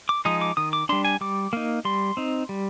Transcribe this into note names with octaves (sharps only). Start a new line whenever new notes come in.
D6
F3 G#3 D#4 D#6
D6
D#3 D#6
D6
G3 D4 C6
G#5
G3 D6
A#3 D#4
G3 C6
C4 D#4
G3